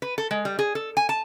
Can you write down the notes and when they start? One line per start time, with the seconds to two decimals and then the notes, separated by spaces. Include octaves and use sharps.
0.02 B4
0.18 A4
0.31 G#3
0.45 G3
0.59 G#4
0.75 A4
0.97 G#5
1.09 A5